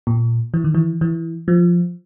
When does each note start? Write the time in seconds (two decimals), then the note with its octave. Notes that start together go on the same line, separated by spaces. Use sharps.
0.07 A#2
0.54 E3
0.64 D#3
0.75 E3
1.01 E3
1.48 F3